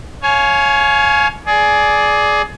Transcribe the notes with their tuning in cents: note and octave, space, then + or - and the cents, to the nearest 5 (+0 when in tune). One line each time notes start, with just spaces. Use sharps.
C#5 +0 F5 +5 G#5 +30
G#4 +20 D5 +0